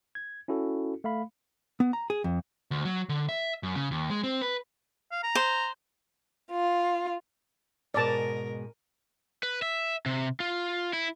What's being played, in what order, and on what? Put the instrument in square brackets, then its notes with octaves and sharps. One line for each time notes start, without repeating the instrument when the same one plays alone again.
[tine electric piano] G#6
C#4 E4 F#4 A4
A3 F5 B5
[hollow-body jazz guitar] B3
A#5
G#4
F2
[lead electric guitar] D2
F#3
D3
E5
F#2
C#3
D#2
G#3
C4
B4
[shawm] F5
A#5
[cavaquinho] C5
[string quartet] F4
[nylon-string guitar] G#2 B2 G#3 [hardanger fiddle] A#4 [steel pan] D5 A5
[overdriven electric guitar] B4
E5
C3
F4
E4